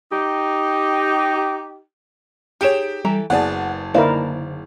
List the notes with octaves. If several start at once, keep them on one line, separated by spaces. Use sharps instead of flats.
D#4 G4
D#4 G4 G#4 C#5 D7 E7
E3 G3 A4 A#5
F#1 B3 G#4 D5 F#5 A5
D3 A#3 D#4 E4 A#4 C5 D5 F5